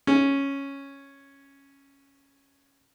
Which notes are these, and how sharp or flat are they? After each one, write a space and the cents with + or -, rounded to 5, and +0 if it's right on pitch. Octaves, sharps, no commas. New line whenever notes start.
C#4 -5